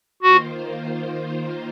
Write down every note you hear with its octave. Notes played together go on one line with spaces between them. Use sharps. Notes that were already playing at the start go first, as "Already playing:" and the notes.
D#3 A#3 F4 F#4 C5